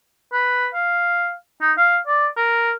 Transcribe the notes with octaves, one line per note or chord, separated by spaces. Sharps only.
B4
F5
D#4
F5
D5
A#4